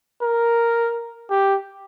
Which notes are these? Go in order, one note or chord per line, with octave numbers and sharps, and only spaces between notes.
A#4
G4